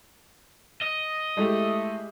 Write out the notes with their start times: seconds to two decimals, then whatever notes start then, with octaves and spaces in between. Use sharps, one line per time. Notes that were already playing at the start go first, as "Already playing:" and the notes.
0.82 D#5
1.37 G#3 A3 E4 G4